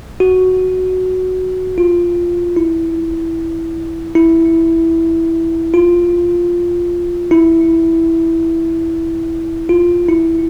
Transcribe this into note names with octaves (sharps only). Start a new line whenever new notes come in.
F#4
F4
E4
E4
F4
E4
F4
E4